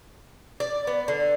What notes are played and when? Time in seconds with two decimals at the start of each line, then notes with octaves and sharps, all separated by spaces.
0.60 D5
0.87 B3
1.08 D3